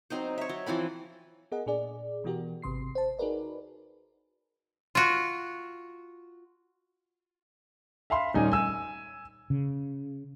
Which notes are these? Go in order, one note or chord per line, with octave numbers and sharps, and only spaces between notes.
F#3 C4 D#4 C5
C#5 E5
F#3
E3 F3 C4 B5
B3 G#4 A#4 D#5 F#5
A#2 D4 G#4 D5
B2 E3 B3 F#4 G4 A#4
G#1 C3 C6 C7
C5 A5
D#4 F#4 G#4 A#4 B4 D5
F4 F#4
E5 F5 B5 C6
D#1 G3 C#4 D#4 G#5
G#5 E6
C#3